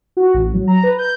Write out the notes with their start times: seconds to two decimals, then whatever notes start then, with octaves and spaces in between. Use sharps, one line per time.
0.17 F#4
0.34 A1
0.54 F#3
0.67 A#5
0.83 B4
0.98 G6